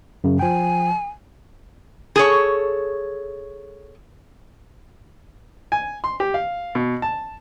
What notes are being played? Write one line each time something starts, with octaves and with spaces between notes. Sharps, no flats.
F#2 C#3
F3 G5 G#5
G#4 A4 C#5
G#5
C6
G4
F5
B2
A5